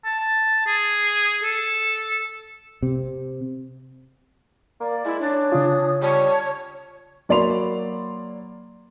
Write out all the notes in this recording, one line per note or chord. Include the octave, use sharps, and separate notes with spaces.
A5
G#4
A4
C3
A#3 D5
G#3 E4
C#4 D4
C#3 F4 D#6
G3 C#5 A5
F#3 A#3 D5 B5 C6 F7